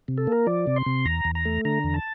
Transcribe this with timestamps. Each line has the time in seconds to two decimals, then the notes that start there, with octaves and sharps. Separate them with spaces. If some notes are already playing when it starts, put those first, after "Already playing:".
0.08 C3
0.18 A4
0.27 A#3 A#4
0.47 F3 D5
0.67 C3
0.76 C6
0.86 C3
1.05 E2 A#5
1.25 E2
1.35 A#5
1.45 A3
1.65 D3 A#5
1.84 E2
1.94 A5